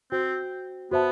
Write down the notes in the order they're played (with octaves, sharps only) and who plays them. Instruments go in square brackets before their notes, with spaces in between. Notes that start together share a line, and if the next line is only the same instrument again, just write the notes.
[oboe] C4 [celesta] F#4 C5 G5
[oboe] B3 [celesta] F#4 C5 E5 A5